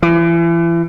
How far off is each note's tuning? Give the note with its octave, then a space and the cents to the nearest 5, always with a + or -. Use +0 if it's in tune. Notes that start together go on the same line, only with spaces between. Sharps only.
E3 +35